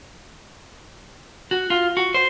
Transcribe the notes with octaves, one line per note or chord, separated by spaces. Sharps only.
F#4
F4
F#4
C5